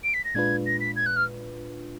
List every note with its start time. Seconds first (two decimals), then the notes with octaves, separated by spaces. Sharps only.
0.04 D7
0.14 B6
0.24 A#6
0.35 A#2 G#3 D4 F4 B4 G#6
0.66 A#6
0.80 B6
0.96 G#6
1.06 F#6
1.16 F6